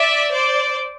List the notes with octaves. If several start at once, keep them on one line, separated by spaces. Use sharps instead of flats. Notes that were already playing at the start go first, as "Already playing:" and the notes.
Already playing: D5 E5
C5 D5